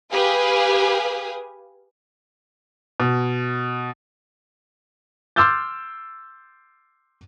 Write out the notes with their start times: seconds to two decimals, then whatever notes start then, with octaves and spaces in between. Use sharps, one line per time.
0.12 G4 G#4 B4 F5 G#5 D#6
3.00 B2
5.36 C6 D6 E6 F6 G6 A6